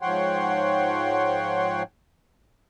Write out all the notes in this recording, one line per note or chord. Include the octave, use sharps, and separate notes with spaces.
G#2 F3 C#5 F#5 G5 C6